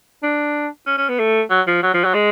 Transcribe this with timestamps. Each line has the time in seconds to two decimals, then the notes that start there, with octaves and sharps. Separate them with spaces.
0.23 D4
0.87 C#4
0.98 C#4
1.09 B3
1.19 A3
1.50 F#3
1.67 F3
1.83 F#3
1.94 F3
2.05 F#3
2.14 G#3